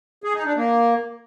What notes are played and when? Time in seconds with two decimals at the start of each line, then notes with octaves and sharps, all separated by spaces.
0.24 G#4
0.35 D#4
0.46 D4
0.57 A#3